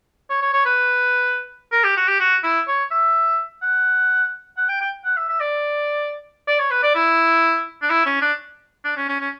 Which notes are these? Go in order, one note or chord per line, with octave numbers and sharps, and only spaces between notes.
C#5
C#5
C#5
B4
A#4
G4
F#4
G4
F#4
E4
C#5
E5
F#5
F#5
G5
G5
F#5
E5
E5
D5
D5
C#5
B4
D5
E4
D4
E4
C#4
D4
D4
C#4
C#4
C#4